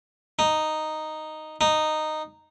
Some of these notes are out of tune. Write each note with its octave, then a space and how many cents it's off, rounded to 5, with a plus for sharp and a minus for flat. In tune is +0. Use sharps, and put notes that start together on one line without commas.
D#4 -5
D#4 -10